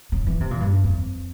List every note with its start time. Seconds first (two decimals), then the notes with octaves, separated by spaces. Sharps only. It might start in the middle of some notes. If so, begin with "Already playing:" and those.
0.12 C#3
0.27 E3
0.41 C3
0.51 A#2
0.60 G2
0.84 F2